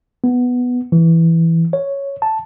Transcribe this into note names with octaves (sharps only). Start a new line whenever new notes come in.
B3
E3
C#5
A5